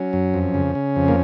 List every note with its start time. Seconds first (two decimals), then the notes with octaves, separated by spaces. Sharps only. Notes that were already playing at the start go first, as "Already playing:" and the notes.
Already playing: F#3 C#4
0.13 F#2
0.34 F2
0.54 C#3
0.75 C#3
0.96 F2
1.08 A#3